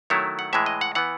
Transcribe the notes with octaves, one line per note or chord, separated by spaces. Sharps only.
D#3 F#3 A3 E4 C#5
F#5
A2 E3 G#3 E5
D#5
F#5
E3 B3 F#5